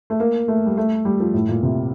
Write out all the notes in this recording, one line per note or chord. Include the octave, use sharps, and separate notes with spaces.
A3
A#3
A3
G3
A3
G3
F3
A2
A#2
C3